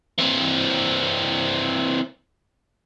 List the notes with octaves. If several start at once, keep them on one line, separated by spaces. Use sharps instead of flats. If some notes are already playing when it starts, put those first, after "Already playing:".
E3 C4